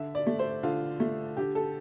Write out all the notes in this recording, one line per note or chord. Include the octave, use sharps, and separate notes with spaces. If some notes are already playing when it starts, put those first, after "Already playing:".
Already playing: D3 E5
D5
A3
C5
D3 F4
A3
D3 G4
A4